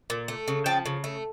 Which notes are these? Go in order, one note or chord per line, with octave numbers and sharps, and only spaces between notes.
A#2
A3
C#3
F3 G5 A5
C#3
A3